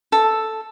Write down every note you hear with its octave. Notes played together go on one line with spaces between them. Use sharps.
A4